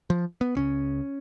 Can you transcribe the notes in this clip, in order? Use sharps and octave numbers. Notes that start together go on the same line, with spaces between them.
F3
B3
C#2 C#3 C#4